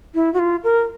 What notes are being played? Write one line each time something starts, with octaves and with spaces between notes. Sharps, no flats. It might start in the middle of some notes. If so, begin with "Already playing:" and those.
E4
F#4
F4
A#4